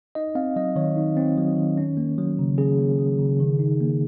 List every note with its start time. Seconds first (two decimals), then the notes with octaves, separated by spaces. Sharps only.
0.15 D#4 D#5
0.35 C4 F5
0.56 F#3 D#5
0.76 D#3 C#5
0.97 D#4
1.17 C4
1.38 F#3
1.57 D#3
1.78 C#4
1.97 A#3
2.18 F#3
2.39 C#3
2.58 C#4 G#4
2.79 A#3
2.99 F#3
3.19 C#3
3.40 D#3
3.59 D#4
3.81 A#3